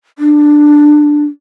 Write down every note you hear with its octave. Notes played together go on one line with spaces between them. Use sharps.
D4